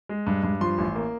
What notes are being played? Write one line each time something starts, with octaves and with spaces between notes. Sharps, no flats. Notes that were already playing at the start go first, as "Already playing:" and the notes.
G#3
G2
G2
F3 C6
A1
A#3